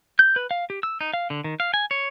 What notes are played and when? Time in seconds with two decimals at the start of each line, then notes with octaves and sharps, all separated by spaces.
0.19 G6
0.36 B4
0.51 F5
0.70 G4
0.83 E6
1.01 D#4
1.13 F5
1.30 D3
1.44 D#3
1.60 F5
1.74 G#5
1.91 C#5